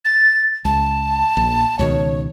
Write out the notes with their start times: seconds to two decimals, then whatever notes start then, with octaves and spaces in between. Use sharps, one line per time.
0.05 A6
0.65 C#2 A5
1.37 A#1
1.79 C#2 B2 D#3 C#5